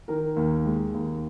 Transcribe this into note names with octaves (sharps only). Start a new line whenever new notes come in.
D#3 A#4
D#2
G#3
D#2